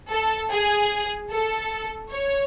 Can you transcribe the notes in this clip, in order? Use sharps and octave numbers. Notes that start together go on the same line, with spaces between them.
A4
G#4
A4
C#5